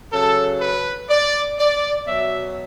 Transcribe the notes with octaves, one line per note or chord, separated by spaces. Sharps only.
C#3 F#3 A4
B4
D5
D5
B2 F#3 E5